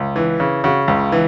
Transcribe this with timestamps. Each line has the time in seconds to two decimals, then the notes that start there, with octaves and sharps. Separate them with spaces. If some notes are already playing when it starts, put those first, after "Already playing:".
Already playing: C#2
0.16 E3
0.40 C#3
0.64 C#3 F#4
0.88 C#2
1.12 E3